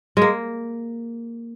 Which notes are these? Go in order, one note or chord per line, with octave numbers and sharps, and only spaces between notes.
G#3 A#3